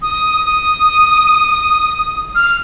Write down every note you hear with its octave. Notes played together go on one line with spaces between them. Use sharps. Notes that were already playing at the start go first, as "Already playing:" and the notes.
D#6
D#6
F6